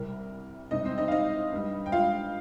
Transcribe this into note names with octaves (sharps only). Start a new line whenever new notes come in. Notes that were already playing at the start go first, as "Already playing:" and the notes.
Already playing: C2 C3 G3 A#4
C2 C3 D#3 G3 D#4 D#5
C4 C5
D#4 D#5
F5
D#4 D#5
G2 G3
G5
F4 F5